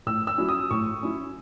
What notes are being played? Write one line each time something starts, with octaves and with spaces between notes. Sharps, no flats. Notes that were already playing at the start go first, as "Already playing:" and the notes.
A2 E6
E6
F#3 C#4 E4
D#6
A2 C#6
F#3 C#4 E4